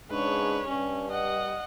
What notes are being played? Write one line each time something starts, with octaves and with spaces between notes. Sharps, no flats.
G#2 C#3 D4 B4 C#5
G2 G3 C#4
D#5 F#5